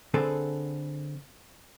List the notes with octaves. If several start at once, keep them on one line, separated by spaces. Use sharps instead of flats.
D3 C4 G#4 A4 B4